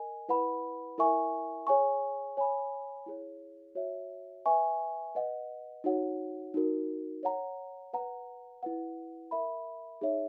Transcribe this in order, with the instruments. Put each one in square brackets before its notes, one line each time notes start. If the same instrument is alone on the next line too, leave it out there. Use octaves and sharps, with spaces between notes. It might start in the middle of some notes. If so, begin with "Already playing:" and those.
Already playing: [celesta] A#4 D#5 G#5
E4 B4 F#5 B5
E4 A#4 E5 G#5 C#6
G#4 C#5 G#5 C#6
C#5 G#5 B5
E4 G#4 C#5
F#4 C#5 E5
B4 E5 G#5 C#6
B4 D#5 F#5
D#4 F#4 C#5 F#5
D#4 F#4 A#4
C#5 F#5 A#5
B4 F#5 A#5
E4 B4 F#5
A#4 E5 B5
D#4 G#4 C#5 E5